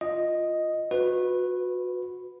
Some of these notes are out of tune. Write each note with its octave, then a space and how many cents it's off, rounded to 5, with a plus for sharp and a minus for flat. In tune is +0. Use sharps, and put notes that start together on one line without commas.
F4 +0 D#5 +0
F#4 -25 B4 +5